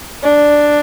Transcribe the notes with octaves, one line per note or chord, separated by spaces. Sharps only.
D4